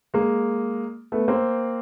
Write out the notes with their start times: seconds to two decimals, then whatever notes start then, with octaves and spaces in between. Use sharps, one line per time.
0.14 G#3 A#3
1.12 A3 B3
1.28 A#3 C4